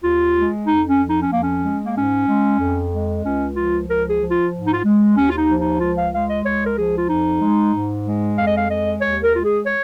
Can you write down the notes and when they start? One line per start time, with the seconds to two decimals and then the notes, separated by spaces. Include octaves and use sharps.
0.03 D#2 F4
0.35 G#3
0.66 F2 D#4
0.88 C#4
0.99 F3
1.10 D#4
1.21 C#4
1.31 F2 A#3
1.43 C#4
1.63 G#3
1.85 A#3
1.96 G#2 C#4
2.28 G#3
2.59 F2
2.91 G#3
3.24 C#2 C#4
3.55 F3 F4
3.88 C#2 A#4
4.09 G#4
4.20 F3
4.31 F4
4.53 G#2
4.66 D#4
4.73 F4
4.85 G#3
5.16 D#2 C#4
5.30 F4
5.38 D#4
5.48 F3
5.60 D#4
5.80 C#2 F4
5.97 F5
6.13 G#3 F5
6.28 D#5
6.45 C#2 C#5
6.66 A#4
6.76 F3 G#4
6.97 F4
7.08 F2 D#4
7.41 G#3
7.74 G#2
8.05 G#3
8.37 F2 F5
8.46 D#5
8.56 F5
8.69 G#3 D#5
9.01 D#2 C#5
9.23 A#4
9.33 G#3 F4
9.44 G#4
9.66 C#5